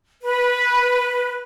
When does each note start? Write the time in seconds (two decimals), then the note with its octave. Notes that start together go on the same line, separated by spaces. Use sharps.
0.23 B4